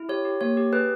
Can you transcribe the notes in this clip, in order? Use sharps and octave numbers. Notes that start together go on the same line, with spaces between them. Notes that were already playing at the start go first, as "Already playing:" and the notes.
Already playing: E4
G4 C#5
G4
A#3 C#5
G4
G#4 B4